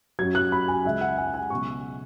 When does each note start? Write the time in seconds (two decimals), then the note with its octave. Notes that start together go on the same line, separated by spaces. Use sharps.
0.19 F#2 F#3 G#6
0.35 F#6
0.52 B5
0.68 G#5
0.85 C#2 C#3 G#3 E5
1.01 F#5
1.18 G#5
1.27 F#5
1.34 G#5
1.50 C#2 B2 F#3 C#6